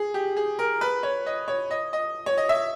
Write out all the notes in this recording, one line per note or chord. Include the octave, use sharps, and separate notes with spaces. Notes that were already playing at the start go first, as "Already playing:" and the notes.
Already playing: G#4
G4
G#4
A#4
B4
C#5
D#5
C#5
D#5
D#5
C#5
D#5
E5